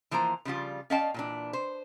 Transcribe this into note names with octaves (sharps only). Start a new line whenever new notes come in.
E3 F3 A#3 C5 A#5
C#3 F3 G3 F4
C#4 D5 D#5 F5 G5 A5
A#2 E3 D4
C5